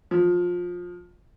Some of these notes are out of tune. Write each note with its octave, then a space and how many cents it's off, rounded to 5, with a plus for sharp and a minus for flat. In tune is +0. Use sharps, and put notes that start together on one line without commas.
F3 +20